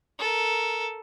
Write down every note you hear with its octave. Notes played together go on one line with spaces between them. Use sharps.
A4 A#4